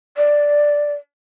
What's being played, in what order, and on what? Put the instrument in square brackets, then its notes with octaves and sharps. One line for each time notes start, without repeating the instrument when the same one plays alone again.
[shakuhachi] D5